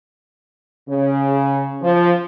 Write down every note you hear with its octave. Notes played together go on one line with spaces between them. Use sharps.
C#3
F3